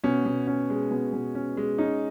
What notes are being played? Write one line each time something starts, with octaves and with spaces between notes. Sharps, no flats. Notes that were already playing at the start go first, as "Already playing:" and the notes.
B2 C#4
B2
C#4
G#3
B2
B2
C#4
G#3
C#4 D#4